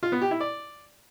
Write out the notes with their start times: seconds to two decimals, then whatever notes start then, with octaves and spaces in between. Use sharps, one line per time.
0.03 F4
0.12 B3
0.22 G4
0.31 E4
0.41 D5